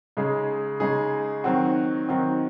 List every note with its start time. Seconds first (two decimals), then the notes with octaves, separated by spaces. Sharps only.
0.17 C#3 G#3 D#4 G#4
0.80 C#3 G#3 D#4 G#4
1.44 D#3 F#3 C4 F#4
2.09 D#3 F#3 C4 F#4